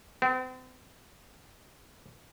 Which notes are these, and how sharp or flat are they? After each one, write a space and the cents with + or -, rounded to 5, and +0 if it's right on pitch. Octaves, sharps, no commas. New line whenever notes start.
C4 -40